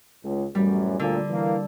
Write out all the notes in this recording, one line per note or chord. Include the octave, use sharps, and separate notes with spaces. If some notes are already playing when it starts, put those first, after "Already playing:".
C#2
A1 F#2 G3
D2 A#2 D3
E3 A#3